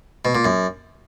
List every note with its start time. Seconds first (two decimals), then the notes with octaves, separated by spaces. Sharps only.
0.25 B2
0.35 A#2
0.45 F#2